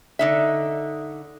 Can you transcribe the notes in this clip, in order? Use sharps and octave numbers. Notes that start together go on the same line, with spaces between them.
D3 D#4 E5